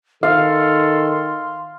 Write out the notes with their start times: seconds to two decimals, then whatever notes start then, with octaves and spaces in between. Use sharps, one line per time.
0.23 D#3 A4 F5 C6